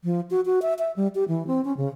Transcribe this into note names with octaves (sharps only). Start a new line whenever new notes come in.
F3
F#4
F#4
E5
E5
G3
G4
E3
C4
C#4
C#3